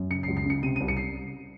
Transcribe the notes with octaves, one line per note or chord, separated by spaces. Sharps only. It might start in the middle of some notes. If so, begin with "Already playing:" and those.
Already playing: F#2
C#3 C#7
C7
C#2
C7
C#3 C#7
C3 D#7
C2 D#7
C#7
C7